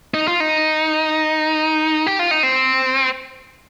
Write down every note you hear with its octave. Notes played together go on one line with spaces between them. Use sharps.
D#4
F4
D#4
G4
F4
D#4
C4